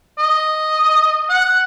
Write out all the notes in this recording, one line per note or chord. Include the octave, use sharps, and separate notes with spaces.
D#5
F#5